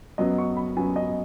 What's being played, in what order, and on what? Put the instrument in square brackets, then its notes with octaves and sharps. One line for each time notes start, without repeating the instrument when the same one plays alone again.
[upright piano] F#2 F#3 B3 D#5
C#6
B5
F#2 F#3 B3 G#5
D#5